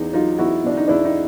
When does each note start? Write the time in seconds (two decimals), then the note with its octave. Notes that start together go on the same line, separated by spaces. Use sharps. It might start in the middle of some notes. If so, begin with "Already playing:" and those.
Already playing: E2 D#4
0.13 F#3 D#4 F4
0.38 E2 E4 F#4
0.64 B2 D4
0.77 D#4
0.88 E2 D4 E4
1.05 D#4